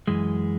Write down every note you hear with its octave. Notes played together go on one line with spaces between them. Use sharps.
F#2 E3 G#3